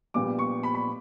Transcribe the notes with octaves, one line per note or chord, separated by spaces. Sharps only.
A#1 A#2 G3 B3 D6
C#6
B5
B5